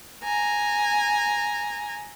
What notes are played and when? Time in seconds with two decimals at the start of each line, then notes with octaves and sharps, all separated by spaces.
0.24 G#5 A#5